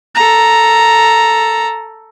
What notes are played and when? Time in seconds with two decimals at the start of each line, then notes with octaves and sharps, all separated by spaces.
0.15 A4 A#5